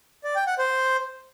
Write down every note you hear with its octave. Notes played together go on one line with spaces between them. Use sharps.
D5
G5
F#5
C5